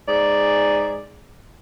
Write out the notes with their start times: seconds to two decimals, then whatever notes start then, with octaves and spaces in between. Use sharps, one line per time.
0.08 G#2 G#4 D5